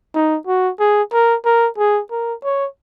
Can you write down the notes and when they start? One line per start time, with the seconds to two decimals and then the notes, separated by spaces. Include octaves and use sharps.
0.14 D#4
0.47 F#4
0.80 G#4
1.13 A#4
1.45 A#4
1.78 G#4
2.11 A#4
2.44 C#5